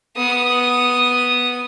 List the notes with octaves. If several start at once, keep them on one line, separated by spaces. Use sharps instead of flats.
B3 D#6